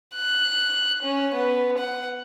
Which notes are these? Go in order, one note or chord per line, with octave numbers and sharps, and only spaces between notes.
F#6
C#4
B3
F#5